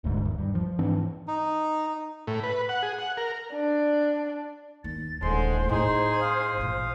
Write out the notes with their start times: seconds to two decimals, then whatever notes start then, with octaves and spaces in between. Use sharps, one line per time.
0.04 D#1 D2 G#2
0.25 E1 D#2
0.38 G2
0.55 F3
0.79 G#2 E3 C4 D4
1.28 D#4
2.27 A2
2.44 B4
2.69 F#5
2.82 G#4
2.99 F#5
3.17 A#4
3.53 D4
4.84 D#2 A6
5.22 D#1 A2 D3 G#3 C5 C6
5.69 A2 C4 D#4 G#4
6.21 F5 D#6
6.57 A1 A#2